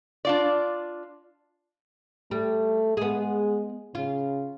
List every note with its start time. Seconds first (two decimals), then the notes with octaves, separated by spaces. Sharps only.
0.25 D4 F4 D5
2.31 G3 A3
2.97 G#3 B3 G#4
3.95 C#3 F4